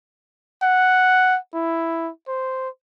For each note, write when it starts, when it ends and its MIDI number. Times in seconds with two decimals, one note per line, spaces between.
0.62 1.38 78
1.54 2.10 64
2.28 2.69 72